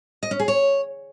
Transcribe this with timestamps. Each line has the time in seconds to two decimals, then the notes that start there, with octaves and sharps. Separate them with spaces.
0.23 D#5
0.31 C#4
0.39 G#4
0.48 C#5